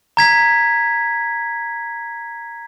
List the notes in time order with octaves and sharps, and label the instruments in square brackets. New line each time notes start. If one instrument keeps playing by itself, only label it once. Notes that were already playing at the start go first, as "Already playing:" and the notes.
[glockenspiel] A#5 G#6 B6